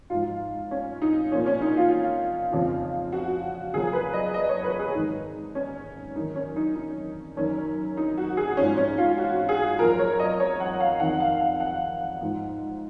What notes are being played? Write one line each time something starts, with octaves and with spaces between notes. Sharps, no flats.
G#2 F3 F4
C#4
D#4
A#2 F3 C#4
C#4
D#4
F4
F2 C#3 F3
F#4
F#2 C#3 F3 G#4
B4
D#5
D#5
C#5
B4
G#4
G#2 D#3 D#4
C#4
F#2 D#3 D#4
C#4
D#4
D#4
F#2 D#3 C#4
D#4
F#4
G#4
G#2 F3 C#4
C#4
F4
F#4
G#4
F#2 F3 A#4
C#5
D#5
C#5
F#5
F5
F2 D#3 F#5
F5
F5
F#5
G#2 F3